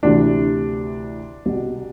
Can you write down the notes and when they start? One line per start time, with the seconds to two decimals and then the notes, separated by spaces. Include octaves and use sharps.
0.03 D2 C3 E3 D4
1.46 C2 B2